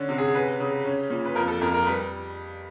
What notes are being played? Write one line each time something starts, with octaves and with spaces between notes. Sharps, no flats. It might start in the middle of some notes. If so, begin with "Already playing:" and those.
Already playing: D3 C#4
C3
G#4
C#4 B4
C#3
C#4
A#2
B4
F2 A#4
A4
F2 A#4
A#4
G3 B4